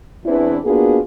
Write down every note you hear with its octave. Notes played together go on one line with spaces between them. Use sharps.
E2 E3 C4 D4 E4 B4
A#3 B3 D4 F4 F#4 G#4